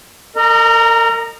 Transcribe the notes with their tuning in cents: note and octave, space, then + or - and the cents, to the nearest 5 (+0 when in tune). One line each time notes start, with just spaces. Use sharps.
A#4 -35 D#5 -25 A#5 +0